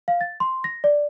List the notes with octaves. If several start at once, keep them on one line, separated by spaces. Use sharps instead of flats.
F5
A6
C6
A#6
D5